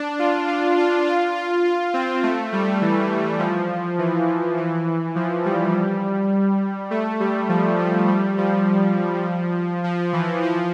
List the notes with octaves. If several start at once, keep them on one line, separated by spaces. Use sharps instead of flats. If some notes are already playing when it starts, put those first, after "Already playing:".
Already playing: D4
F4
F4
F4
F4
F4
F4
C4
A3
G3
E3
F3
E3
E3
F3
G3
A3
G3
F3
F3
G3
F3
F3
E3
F3